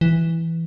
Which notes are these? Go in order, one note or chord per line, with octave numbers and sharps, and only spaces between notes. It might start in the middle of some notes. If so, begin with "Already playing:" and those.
E3